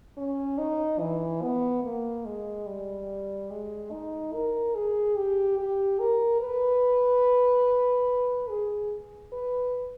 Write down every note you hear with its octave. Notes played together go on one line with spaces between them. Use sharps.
C#4
D#4
E3
B3
A#3
G#3
G3
G#3
D#4
A#4
G#4
G4
G4
A#4
B4
G#4
B4